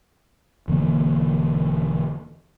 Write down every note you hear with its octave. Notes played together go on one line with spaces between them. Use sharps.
E1 D3 E3 A#3